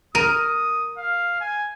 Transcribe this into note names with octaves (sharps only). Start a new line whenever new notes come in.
A#4 D#6 D#7
F5
G#5